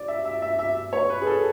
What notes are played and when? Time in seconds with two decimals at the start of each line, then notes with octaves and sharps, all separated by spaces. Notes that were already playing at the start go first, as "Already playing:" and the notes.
Already playing: D5
0.08 E5
0.25 E5
0.42 E5
0.59 E5
0.93 C#5
1.10 B4
1.22 G#4
1.26 A4